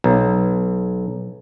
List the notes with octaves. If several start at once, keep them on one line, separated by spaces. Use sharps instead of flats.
B1